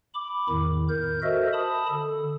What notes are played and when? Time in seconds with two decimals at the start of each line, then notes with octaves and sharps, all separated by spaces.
0.14 B5 D6
0.49 E2 A2 D#3
0.89 A#4 G6
1.23 F#4 A4 A#4 C5 D#5 E5
1.53 A5 B5 D#6
1.90 D3 A4